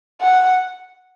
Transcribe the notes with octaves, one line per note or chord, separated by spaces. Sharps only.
F#5